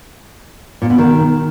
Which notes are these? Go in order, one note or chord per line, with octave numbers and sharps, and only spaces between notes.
A#2
B2
D#3